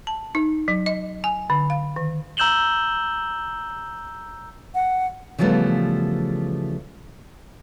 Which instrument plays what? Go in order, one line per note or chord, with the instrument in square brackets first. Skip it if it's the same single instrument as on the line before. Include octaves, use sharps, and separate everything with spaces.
[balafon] A5
D#4
F#3
D#5
G#5
D3
F5
D#3
[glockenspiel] A#5 E6 G6 E7 F#7 G7
[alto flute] F#5
[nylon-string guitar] C#3 E3 F3 G3 A3 B3